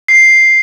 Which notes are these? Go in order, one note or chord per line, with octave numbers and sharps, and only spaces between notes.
C7